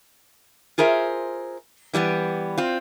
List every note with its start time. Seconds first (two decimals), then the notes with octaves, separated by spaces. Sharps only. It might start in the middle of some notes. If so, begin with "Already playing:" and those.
0.78 F4 G#4 A#4 C5 E5
1.93 E3 G3 A3 B3
2.58 C4 F4